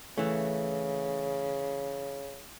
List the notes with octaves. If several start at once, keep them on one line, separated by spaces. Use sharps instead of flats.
C#3 E3 A3